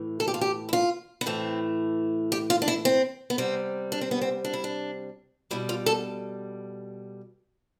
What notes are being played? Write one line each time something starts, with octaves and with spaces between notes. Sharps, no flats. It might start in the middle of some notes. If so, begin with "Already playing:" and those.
Already playing: A2 E3 A3
A4
G4
F4
G4
E4
F4
B3
A2 E3 A3 C4
G4
F4
D4
E4
C4
B3
C3 G3 C4
D4
C4
B3
C4
D4
E4
D4
B2 G3 E4
F4
A4